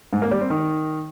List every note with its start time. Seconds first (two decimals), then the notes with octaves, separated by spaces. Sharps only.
0.13 G#2
0.22 A#3
0.31 G3
0.41 C4
0.50 D#3